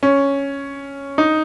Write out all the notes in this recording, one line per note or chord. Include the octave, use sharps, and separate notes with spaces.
C#4
D#4